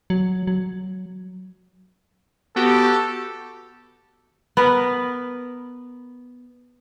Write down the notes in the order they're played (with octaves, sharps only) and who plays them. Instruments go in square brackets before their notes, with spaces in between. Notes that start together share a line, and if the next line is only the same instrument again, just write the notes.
[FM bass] F#3
F#3
[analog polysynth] B3 F#4 G4 [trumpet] A4
[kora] B3 A#4 B4